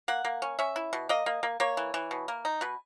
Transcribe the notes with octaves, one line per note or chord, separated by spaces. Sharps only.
A#3 F#5
A#3
C#4
C#4 E5
E4
B2
A#3 D#5
A#3
A#3
A#3 C#5
E3
E3
B2
A#3
D#4
B2 B4